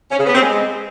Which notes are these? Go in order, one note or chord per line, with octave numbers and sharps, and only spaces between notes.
C#4
C#3
B3
C4
G#3